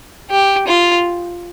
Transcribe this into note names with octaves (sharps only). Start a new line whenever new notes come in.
G4
F4